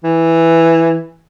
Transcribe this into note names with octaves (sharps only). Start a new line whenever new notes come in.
E3